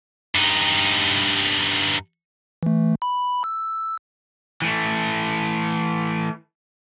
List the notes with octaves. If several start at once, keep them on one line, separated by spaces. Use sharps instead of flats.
G2 D#4
E3 A3
B5
E6
E3 A3